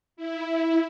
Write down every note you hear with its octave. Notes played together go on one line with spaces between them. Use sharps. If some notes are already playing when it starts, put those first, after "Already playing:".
E4